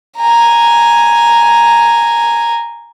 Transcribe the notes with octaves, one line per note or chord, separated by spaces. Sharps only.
G#5 A#5